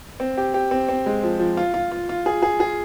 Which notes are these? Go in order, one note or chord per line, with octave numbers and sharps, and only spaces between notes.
C4
G4
G4
C4
C4
G#3
F3
F3
F4
F4
F4
F4
G#4
G#4
G#4